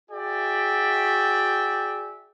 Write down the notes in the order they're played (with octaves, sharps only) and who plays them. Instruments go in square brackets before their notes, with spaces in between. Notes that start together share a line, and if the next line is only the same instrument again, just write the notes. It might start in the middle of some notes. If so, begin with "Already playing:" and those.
[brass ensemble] F#4 G#4 D5 E5 G5